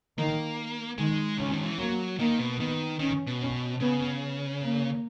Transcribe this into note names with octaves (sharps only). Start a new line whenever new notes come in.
D#3 A#3
D#3 G#3
C#3 C#4
D#3
E3
F#3 A#3
D#3 A#3
B2
D#3 B3
D#3 C#4
B2
C#4
C#3 B3
A#3